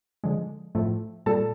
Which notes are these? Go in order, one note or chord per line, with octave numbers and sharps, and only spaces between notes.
D3 F3 G#3
A2 F3 A3
A#2 G3 A4 A5